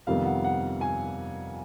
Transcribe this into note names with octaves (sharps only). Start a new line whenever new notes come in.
F2 C3 D#3 G3 B3 F5
F#5
F#5
G#5